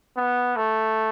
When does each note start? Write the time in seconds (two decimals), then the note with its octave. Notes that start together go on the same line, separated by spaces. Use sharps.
0.16 B3
0.56 A3